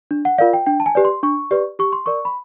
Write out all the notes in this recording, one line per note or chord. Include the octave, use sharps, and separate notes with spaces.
D4
F#5
F4 A#4 D5 F5
G5
D4 G5
A5
G#5
G4 B4 D5
C6
D4 C#6
G4 B4 D5
G4 C#6
C6
A#4 D5 C#6
B5